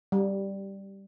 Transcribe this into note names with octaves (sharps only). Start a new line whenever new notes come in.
G3